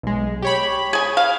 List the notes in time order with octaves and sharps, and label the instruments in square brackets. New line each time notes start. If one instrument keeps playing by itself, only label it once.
[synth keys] B1 G#3
G4 C#5 B5
[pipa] G#4 G#5
F5